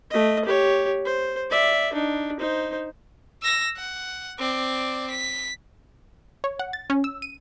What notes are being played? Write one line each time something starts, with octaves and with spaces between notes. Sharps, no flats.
A3 D#5
G4 C#5
C5
D5 E5
D4 D#4
D#4 C5
E6 A#6
F#5
C4 D5
B6
C#5
F#5
A6
C#4
E6
D#7